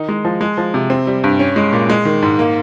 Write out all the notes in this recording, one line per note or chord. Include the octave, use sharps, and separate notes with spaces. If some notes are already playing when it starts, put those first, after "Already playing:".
Already playing: D#3 D#4
G#3
F3
G#3
F3
C3
C4
G3
G2
C#4
G#3
A#2
G#3
D#3
G#2
A#3